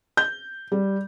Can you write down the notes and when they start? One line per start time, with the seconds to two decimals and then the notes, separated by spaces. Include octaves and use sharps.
0.17 G6
0.72 G3